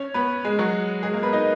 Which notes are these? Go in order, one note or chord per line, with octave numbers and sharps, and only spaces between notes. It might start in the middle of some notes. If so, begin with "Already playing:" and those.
Already playing: C#4 C#5
B3 B4
G#3 G#4
F#3 F#4
G#3 G#4
A#3 A#4
B3 B4
D#4 D#5